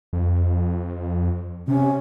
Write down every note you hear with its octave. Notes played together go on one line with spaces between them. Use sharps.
F2
C3 C#4